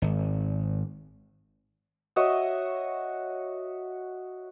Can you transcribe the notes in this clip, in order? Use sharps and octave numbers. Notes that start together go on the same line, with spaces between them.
G#1
F#4 C#5 D#5 E5